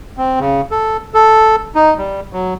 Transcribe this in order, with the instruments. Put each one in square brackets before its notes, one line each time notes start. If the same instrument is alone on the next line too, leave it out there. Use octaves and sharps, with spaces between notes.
[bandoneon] C4
C#3
A4
A4
D#4
G3
F#3